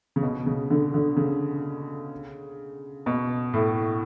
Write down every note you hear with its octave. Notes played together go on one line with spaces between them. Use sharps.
C#3
B2
C#3
D3
D3
C#3
B2
A2